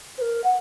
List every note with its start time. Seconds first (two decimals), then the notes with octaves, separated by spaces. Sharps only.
0.18 C5
0.21 A#4
0.44 F#5